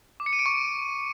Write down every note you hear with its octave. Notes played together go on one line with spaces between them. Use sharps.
D6
C#7
D#7
D7
C#6